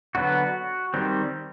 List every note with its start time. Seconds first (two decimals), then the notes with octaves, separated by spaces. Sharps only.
0.15 D3 F#3 B3 F#4
0.94 D#3 G3 C4